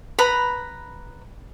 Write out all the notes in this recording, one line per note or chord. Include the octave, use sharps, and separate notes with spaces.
B4 A#5 B5